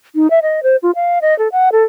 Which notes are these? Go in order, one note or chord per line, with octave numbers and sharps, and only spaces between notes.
D#4
E5
D#5
C5
F4
F5
D#5
A4
F#5
A4